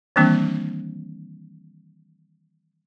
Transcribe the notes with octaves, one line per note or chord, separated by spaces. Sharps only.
D#3 E3 G3 A#3 C4 D4